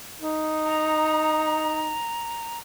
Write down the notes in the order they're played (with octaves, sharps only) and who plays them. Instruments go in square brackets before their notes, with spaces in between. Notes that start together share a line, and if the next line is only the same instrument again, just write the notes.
[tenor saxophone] D#4
[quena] A#5